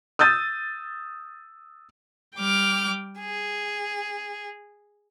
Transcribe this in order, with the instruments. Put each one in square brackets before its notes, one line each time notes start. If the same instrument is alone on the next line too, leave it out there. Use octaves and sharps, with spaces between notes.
[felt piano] D#6 E6 G6 A6 D#7
[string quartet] G3 G5 D6 F6
G#4